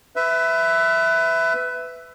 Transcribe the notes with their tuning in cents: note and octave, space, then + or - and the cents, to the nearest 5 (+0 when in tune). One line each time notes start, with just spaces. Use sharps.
B4 +20 E5 +0